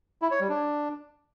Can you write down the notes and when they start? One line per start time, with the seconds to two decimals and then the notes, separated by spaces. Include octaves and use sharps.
0.22 E4
0.31 C#5
0.40 G3
0.49 D4